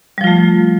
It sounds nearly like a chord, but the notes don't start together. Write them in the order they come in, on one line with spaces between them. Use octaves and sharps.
G3 F3 F4 A3